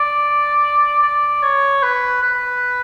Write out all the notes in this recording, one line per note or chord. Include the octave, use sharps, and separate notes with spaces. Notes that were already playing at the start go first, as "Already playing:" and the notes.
Already playing: D5
D5
C#5
B4
B4